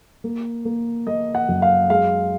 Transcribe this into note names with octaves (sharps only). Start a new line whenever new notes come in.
A#3
A#3
A#3 D#5
F#5
F#2
F5
G#3 F5